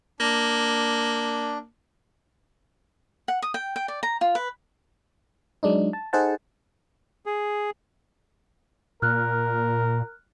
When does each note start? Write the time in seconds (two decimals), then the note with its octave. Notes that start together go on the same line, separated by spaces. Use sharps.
0.20 A#3 D4
3.28 F#5
3.42 D#6
3.54 G5
3.76 G5
3.88 D5
4.03 A#5
4.21 F4
4.35 B4
5.63 F#3 G#3 D4 D#4
5.93 A5
6.13 D#4 G#4 A4 C5 F#5 A5
7.26 G#4
9.02 A#2 A#4 F6 F#6